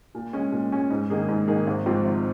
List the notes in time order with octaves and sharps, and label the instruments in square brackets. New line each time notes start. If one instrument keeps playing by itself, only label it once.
[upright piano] A#2
G#3 C#4
A#2
G#3 C#4
G#2
D#3 A#3 D#4 G#4
G#2
D#3 A#3 D#4 G#4
G#1
G#2 F3 C4 F4
G#1